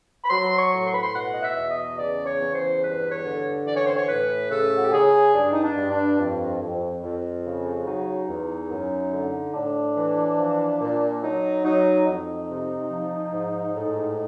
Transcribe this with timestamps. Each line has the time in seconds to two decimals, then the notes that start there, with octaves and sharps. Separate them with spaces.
0.24 B5
0.30 F#3 C6
0.59 C#6
0.72 A2
0.87 C6
0.94 B5
1.03 C6
1.14 B2 F#5
1.32 D#5
1.42 E5
1.56 E2
1.70 D#5
1.98 C#3 D5
2.26 C#5
2.40 E2
2.55 C5
2.83 G2 B4
3.11 C#5
3.24 D3
3.66 E3 D5
3.77 C#5
3.87 C5
3.97 C#5
4.08 A2 B4
4.50 C#3 A4
4.76 F#4
4.84 G4
4.92 C#3 G#4
5.34 G2 D4
5.53 D#4
5.63 D4
5.77 G2
5.91 D4
6.19 F2
6.61 F2
7.03 F2
7.44 C#3
7.86 F#3 D#4
8.28 E2
8.71 F#2
9.12 D3
9.54 A2 D4
9.96 E3
10.38 F3
10.81 A#2
11.22 F#3 D#4
11.64 F#3 D#4
12.06 F2 D#4
12.48 C3
12.90 F3
13.33 G#2
13.74 A2